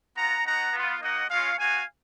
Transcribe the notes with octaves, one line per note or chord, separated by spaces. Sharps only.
B3 F4 F#5 A#5
B3 D#4 F#4 F#5 A#5
B3 F4
A#3 D#4 F#4 D#5 F#5
G#3 C#4 F4 C#5 F5
B3 F#4 F5 G#5